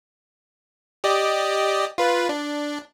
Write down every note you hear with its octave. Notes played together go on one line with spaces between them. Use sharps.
G4 D5 D#5
F4 B4
D4